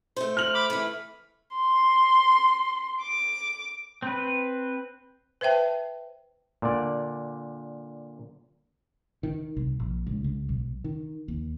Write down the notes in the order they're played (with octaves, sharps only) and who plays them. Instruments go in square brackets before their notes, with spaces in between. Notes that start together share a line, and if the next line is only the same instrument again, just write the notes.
[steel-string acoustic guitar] A3 C5
[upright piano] F6 F7 F#7
[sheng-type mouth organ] B5 D6
[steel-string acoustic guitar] E3 A3 [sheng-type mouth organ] B5
[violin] C6
D6
[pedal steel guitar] C4 B4
[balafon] B4 C5 E5 G5 A5
[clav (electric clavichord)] A#2 D3 D5
[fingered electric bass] D#3
C2
A#1
C#2
C#2
B1
D#3
D#2